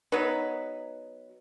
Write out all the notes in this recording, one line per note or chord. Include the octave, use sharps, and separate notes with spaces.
F#3 B3 D#4 B4